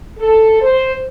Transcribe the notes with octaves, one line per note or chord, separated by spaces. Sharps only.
A4
C5